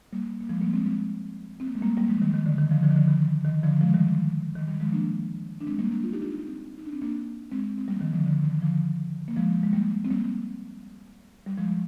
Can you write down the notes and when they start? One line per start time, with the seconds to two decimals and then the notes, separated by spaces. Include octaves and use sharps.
0.13 G3 A#3
0.40 A#3
0.49 F3 G#3
0.61 G3 A#3
0.73 G#3 C4
0.86 G#3 C4
1.60 C4
1.67 A#3
1.75 G#3
1.82 G3 A#3
1.97 G3 A#3
2.10 F3 G#3
2.21 D#3 G3
2.34 D#3
2.46 D3
2.58 D#3
2.71 D3 F3
2.83 D3 F3
2.90 D#3
2.95 D3 F3
3.08 D#3
3.45 D#3
3.63 D3 F3
3.81 F3 G#3
3.94 D#3 G3
4.07 D#3
4.55 D#3
4.68 D#3 G3
4.80 F3 G#3
4.93 A#3 D4
5.61 D4
5.67 G#3 C4
5.79 G3 A#3
5.91 A#3 D4
6.03 D4 F4
6.13 D#4 G4
6.22 D4 F4
6.32 D#4
6.39 F4
6.46 C4 D#4
6.78 D#4
6.86 D4
6.93 C4
7.02 A#3 D4
7.51 G#3 C4
7.78 C4
7.88 G3 A#3
7.96 F3
8.01 D#3 G3
8.13 D3 F3
8.26 D3
8.44 D#3
8.62 D3 F3
9.28 A#3
9.36 F3 G#3
9.63 G#3
9.73 G3 A#3
10.05 C4
10.10 G3 A#3
11.46 G3
11.58 F3 G#3